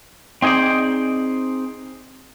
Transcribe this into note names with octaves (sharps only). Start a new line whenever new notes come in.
C4 D#4 G#4 C5 D5